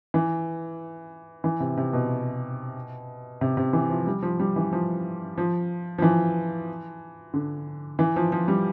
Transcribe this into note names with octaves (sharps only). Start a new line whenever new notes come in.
E3
E3
C3
C3
B2
C3
C3
E3
F3
G3
F3
G3
E3
F3
F3
F3
E3
D3
E3
F3
F3
G3